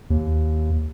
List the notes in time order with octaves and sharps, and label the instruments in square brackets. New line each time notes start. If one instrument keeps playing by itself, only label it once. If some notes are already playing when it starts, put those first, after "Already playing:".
[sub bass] D#2